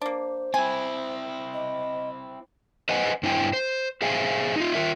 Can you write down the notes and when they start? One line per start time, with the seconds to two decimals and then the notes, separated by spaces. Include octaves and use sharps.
0.02 A#3 D4 C5
0.54 C4 E4 G#5
1.54 D#5
2.89 B4 C5 D#5 F#5 G#5
3.23 G2 D4 E4 C5 G5 G#5
3.53 C5
4.02 G#4 C5 E5 F5 G#5
4.56 D#4 F4
4.74 F4 A#4 E5